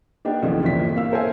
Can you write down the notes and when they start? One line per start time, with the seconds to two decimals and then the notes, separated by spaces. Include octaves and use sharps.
0.25 A#3 B3 D4 D#4 G4 G5
0.42 B1 F2 C#3 E3 F3 A3
0.62 G1 D#2 A#2 E3 C4 B6
0.96 A#3 F5 E6
1.11 A4 A#4 C5 C#5 E5 G#5